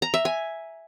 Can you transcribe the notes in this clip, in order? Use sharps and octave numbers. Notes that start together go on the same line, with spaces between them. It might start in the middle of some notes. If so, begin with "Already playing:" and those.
A#5
E5
G#5